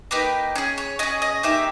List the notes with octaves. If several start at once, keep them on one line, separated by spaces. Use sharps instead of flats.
A#3 D#4 G4 B4
C#4 G#4
C#5
C#4 G#4 D#5
D#5
A#3 D#4 G4 E5